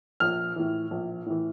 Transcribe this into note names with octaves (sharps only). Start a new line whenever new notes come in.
A#1 F6
A2 E3
A#1
A2 E3